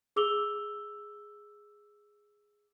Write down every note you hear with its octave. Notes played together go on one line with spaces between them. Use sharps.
G#4 D6 E6 F7 G7